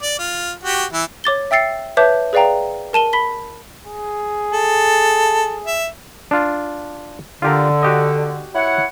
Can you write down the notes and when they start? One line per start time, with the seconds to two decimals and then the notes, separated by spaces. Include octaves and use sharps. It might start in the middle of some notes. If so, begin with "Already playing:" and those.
0.03 D5
0.19 F4
0.63 F#4 G4
0.93 E3 E4
1.24 C#5 D6 A6 G7
1.51 E5 G5 E6 A6 C7 C#7
1.97 B4 C#5 E5 A5 D6 G6
2.33 G#4 B4 D5 F5 G5 A#5
2.93 A#4 A5 D#7 G7
3.13 B5 B6 G7
3.86 G#4
4.52 A4
5.66 E5
6.31 D4 F4
7.42 D3 F4 G4 A#4
7.83 F#4 G4 D#5
8.55 E4 C#5 F#5